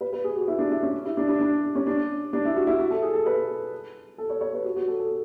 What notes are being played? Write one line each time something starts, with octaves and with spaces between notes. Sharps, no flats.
B4
B4
G#4
F#4
E4
D4
E4
C#4
E4
D4
D4
D4
C#4
D4
D4
E4
F#4
E4
F#4
A4
G#4
A4
B4
A4
C#5
C#5
B4
F#4
F#4
A4
A4